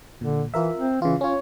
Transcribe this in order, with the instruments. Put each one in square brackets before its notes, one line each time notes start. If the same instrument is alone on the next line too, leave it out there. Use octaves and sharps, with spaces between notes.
[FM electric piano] A#2 [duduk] D3
[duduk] E3 [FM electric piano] F4 A#4 E5
[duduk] C4
[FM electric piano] C#3 F4 [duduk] E3
[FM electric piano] C#4 F4 [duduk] C#5